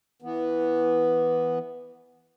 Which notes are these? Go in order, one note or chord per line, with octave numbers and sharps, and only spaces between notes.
E3 B3